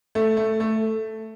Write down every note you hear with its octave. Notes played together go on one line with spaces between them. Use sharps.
A3
A3
A3